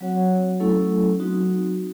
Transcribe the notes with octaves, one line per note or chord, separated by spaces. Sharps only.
F#3 C4 F#4 C#5 F#5
F#3 A3 C#4 E4 A4
F#3 C4 D#4 F#4